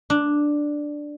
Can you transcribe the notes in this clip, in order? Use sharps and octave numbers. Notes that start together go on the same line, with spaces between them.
D4